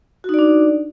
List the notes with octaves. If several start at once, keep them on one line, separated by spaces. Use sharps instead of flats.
D4 D#4 F#4 D5